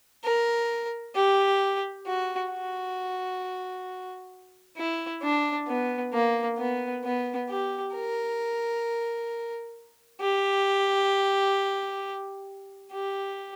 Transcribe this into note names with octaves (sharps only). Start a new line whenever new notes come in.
A#4
G4
F#4
F#4
E4
D4
B3
A#3
B3
B3
G4
A#4
G4
G4